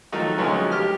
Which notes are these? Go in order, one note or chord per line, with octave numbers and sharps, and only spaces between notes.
D#3 F3 F#3 A3 D#4
D2 F3 F#3 G#3 B3 C#4
G4 F6